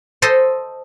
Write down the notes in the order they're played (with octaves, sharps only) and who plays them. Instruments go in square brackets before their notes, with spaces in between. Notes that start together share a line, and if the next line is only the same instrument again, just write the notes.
[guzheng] A4 C5 D#5